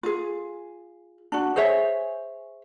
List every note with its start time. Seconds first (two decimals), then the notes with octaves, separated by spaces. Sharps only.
0.03 F4 G#4
1.32 D4 F#4
1.56 G#4 C5 C#5 E5